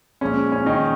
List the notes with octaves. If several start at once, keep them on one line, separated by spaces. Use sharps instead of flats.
A#2 F3 G#3 C#4
C#4
D#3 D#4